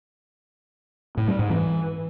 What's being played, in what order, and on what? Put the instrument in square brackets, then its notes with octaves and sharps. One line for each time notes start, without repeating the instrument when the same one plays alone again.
[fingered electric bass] A2
G3
G#2
E3